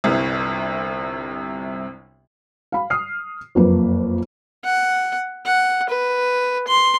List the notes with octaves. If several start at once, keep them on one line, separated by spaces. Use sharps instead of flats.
G1 C2 C3
F5 B5
D#6 F6 C7
F#1 F2 A#3 B4
F#5
F#5
B4
C6